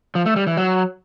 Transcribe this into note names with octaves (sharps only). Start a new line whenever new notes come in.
F3
A3
G3
E3
F#3